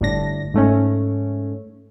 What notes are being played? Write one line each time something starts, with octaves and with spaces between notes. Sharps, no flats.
G1 A2 D4 A#6
G#2 A3 C#4